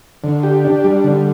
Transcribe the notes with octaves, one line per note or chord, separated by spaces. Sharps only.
D3
G4
D4
G3
D3